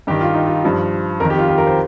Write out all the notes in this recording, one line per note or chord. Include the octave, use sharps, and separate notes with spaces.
G2 D#3 G4
F4
D#4
F4
G2 F3
F2 D#3 A#4
G4
F4
G4
A#4
C5